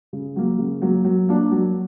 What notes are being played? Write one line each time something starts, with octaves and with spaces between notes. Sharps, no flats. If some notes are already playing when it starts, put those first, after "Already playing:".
C#3
F#3 A#3
C#3
F#3 A#3
F#3
A#3 D4
F#3